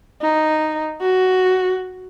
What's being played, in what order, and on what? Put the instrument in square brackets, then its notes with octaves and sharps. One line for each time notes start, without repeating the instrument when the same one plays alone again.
[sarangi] D#4
F#4